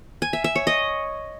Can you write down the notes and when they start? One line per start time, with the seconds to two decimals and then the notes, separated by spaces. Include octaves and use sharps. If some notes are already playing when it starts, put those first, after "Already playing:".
0.22 G#5
0.33 E5
0.44 E5
0.56 C#5
0.67 D#5